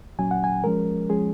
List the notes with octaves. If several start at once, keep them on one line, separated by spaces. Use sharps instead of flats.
A#2 F#3 C#4 G#5
F#5
G#5
F3 G#3 C#4 A#4
F3 G#3 C#4 G#4